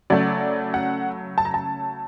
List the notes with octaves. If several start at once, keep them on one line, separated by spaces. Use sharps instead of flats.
C#3 F#3 A3 D5
F#5
A5
A#5
A5